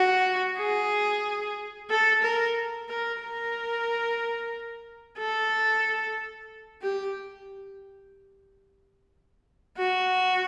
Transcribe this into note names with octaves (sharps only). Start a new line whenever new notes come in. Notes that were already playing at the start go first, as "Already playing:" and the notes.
Already playing: F#4
G#4
A4
A#4
A#4
A#4
A4
G4
F#4